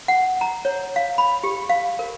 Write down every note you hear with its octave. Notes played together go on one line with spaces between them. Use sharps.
F#5
A#5
C#5
F5
B5
G4
F5
A#4